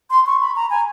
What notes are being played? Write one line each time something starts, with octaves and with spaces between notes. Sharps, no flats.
C6
C#6
B5
A#5
G#5